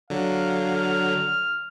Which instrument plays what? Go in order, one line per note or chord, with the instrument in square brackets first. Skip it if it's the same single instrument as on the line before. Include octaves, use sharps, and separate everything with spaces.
[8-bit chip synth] D3 F#3 [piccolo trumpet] F5
[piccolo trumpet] F6